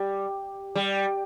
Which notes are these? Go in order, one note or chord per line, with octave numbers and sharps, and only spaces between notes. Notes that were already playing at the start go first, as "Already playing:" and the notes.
Already playing: G3
G3